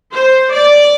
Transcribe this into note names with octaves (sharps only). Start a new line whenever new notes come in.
C5
D5